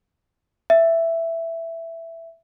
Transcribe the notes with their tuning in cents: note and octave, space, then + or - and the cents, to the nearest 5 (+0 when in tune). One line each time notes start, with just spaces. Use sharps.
E5 +5